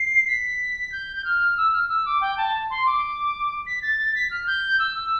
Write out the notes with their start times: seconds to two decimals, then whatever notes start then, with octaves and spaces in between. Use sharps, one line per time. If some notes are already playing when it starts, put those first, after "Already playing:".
Already playing: C7
0.27 B6
0.92 G6
1.16 G6
1.24 F6
1.57 E6
1.73 F6
1.89 E6
2.05 D6
2.21 G5
2.37 A5
2.70 C6
2.86 D6
3.66 B6
3.82 A6
4.15 B6
4.31 F6
4.47 G6
4.79 E6